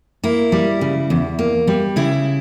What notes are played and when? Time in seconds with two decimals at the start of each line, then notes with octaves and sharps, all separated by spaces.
0.24 A#3 E4
0.52 G3
0.81 C#3
1.10 E2
1.39 A#3
1.67 G3
1.96 C#3 E4